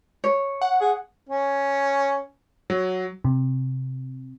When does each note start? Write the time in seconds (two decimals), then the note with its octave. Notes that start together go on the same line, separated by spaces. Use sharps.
0.24 C#5
0.61 F#5
0.81 G#4
1.29 C#4
2.70 F#3
3.24 C3